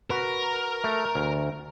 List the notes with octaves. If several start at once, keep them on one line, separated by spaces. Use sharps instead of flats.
F#4 A#4 B4
A3
D2